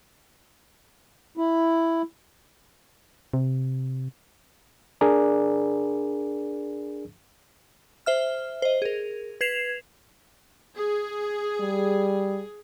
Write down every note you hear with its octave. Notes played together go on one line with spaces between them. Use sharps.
E4
C3
D4 G#4 A#4 D5
C5 E5 F6
C5 D#5
G#4 A#4
B4 G#6 C7 E7 F7
G#4
G3